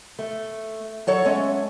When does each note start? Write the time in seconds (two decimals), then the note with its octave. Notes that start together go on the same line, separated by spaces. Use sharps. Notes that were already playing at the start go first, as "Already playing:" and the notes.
0.19 A3
1.07 F#3 A4 C#5 F#5
1.25 G#3 A3 C#4